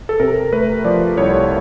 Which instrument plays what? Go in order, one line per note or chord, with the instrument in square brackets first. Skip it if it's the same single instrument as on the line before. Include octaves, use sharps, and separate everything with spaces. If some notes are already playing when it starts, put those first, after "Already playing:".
[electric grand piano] A4
C3 A#4
A3 B4
F3 D5
C2 C#5